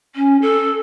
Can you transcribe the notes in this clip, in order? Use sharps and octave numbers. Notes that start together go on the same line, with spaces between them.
C#4
A4